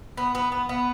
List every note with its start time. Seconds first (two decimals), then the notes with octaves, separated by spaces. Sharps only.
0.17 B3
0.35 B3
0.52 B3
0.69 B3